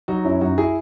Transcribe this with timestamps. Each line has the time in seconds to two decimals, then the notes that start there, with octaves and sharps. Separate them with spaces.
0.08 F#3 D#4 F#4
0.25 F#2 C#4 E4
0.41 F#2 D#4 F#4
0.58 E4 G#4